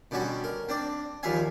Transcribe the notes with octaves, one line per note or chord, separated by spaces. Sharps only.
B2 D3 G3 C#4 F#4
A#4
C4 D4 D5
D#2 F3 G3 E5 F5 G#5